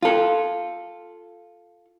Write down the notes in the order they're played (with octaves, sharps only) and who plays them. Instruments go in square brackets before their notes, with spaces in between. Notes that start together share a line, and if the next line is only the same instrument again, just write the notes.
[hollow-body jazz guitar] F4 A4